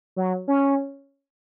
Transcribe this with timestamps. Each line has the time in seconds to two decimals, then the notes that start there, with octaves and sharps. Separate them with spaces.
0.16 F#3
0.48 C#4